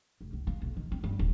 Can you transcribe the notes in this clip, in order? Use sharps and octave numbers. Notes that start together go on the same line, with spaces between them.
F1
C#2
A#3
B1
D#3
C4
G2
D#1